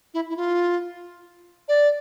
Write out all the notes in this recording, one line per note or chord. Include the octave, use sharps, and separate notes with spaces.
E4
E4
F4
D5